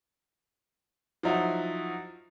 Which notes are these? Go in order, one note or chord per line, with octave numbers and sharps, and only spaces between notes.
F3 F#3 D#4 E4 F#4